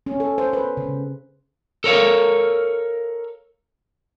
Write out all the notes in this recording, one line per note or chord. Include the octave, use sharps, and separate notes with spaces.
C#4
A4
C5
B4
C#3
A4 A#4 C#5 F5